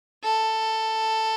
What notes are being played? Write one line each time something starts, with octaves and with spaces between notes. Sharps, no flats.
A4